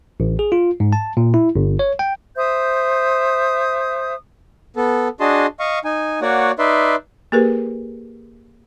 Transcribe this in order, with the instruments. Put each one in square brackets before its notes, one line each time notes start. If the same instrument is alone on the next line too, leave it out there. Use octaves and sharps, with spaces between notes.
[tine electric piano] A1
G#4
F4
G#2
A5
A#2
E4
G1
C#5
G5
[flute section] C5 E5 D#6 G6
[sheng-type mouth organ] B3 A4
D4 F#4 G#4 D#5 A5 C6
D#5 F5 C#6
D#4 G#5
A#3 F#4 C#5 D5 F#5
D#4 B4 D5 E5 C6
[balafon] A#3 G4 G#4 A#4 B4